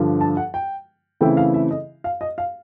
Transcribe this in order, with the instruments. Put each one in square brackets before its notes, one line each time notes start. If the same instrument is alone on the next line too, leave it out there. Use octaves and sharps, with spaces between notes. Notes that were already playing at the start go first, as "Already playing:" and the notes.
Already playing: [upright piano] G2 D3 F3
A5
F#5
G5
C#3 E3 A3 C4 E4 G5
F5
E5
D#5
F5
D#5
F5